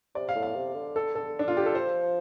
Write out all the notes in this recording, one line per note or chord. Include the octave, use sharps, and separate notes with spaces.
C3 D5
F5
A2
F5
C3
D3
A4
A4
D4
F4
G4
A4
F3 C5